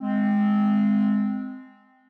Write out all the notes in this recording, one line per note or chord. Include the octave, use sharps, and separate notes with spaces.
G#3 C4